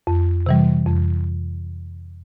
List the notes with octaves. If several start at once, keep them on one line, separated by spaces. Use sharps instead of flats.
F2
C3 E3 G3
F2